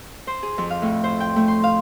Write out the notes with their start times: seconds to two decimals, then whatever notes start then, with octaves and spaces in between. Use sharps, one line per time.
0.27 C5
0.43 G#4
0.58 F2
0.70 F5
0.82 A2
1.04 C5
1.20 G5
1.36 A3
1.48 C6
1.64 F5